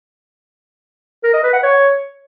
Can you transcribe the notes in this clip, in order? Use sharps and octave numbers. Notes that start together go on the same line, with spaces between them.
A#4
D#5
B4
F#5
C#5